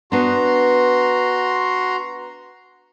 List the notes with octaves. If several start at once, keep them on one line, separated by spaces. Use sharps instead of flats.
B3 D4 F#4 A#5 C6